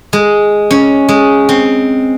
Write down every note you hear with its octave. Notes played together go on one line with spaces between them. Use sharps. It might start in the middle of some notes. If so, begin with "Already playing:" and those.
G#3
C#4
G#3
C4